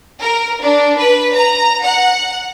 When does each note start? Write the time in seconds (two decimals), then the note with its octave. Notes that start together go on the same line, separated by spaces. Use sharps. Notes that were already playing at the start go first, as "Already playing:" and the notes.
0.21 A#4
0.62 D4
0.99 B4
1.35 A#5
1.85 F#5